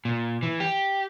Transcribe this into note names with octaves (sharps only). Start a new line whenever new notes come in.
A#2
E3
G4